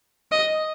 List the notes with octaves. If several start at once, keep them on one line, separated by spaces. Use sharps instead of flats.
D#5